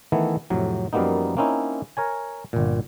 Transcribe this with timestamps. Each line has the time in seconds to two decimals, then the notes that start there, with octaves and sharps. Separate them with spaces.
0.12 D#3 E3 A3 B3 E4
0.50 F2 A2 C3 F#3
0.93 F#2 F3 G3 A#3 B3 D#4
1.37 A#3 C4 C#4 D#4 E4
1.97 A#4 C#5 G#5
2.53 G1 A#2